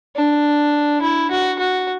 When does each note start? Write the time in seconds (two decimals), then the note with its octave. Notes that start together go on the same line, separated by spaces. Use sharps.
0.16 D4
1.02 E4
1.31 F#4
1.59 F#4